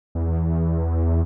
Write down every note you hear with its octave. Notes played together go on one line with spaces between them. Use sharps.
E2